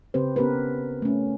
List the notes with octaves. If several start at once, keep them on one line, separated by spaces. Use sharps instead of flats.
C#3 C4 G4 B4 C5
B3 C#4 G4 A#4 B4
A3 C#4